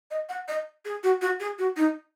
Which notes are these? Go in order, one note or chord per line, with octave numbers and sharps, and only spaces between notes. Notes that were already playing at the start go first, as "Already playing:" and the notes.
D#5
F#5
D#5
G#4
F#4
F#4
G#4
F#4
D#4